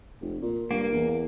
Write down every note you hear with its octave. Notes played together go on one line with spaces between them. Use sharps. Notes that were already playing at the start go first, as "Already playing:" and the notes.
F1
A#2
G2 A#3
E2